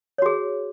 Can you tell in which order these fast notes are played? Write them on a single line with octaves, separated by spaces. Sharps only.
C#5 F#4 G#4